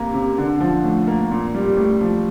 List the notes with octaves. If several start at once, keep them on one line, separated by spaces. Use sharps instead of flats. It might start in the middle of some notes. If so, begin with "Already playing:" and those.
Already playing: C3 A#3
C3
D3
F3
A2
A#3
A#2
G3
A2
F3